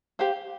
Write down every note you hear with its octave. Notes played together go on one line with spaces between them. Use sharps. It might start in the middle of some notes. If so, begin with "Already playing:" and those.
G4 C5 F5